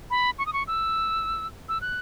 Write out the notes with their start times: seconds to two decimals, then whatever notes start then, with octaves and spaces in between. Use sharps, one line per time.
0.10 B5
0.38 C#6
0.46 D#6
0.53 C#6
0.67 E6
1.69 E6
1.81 F#6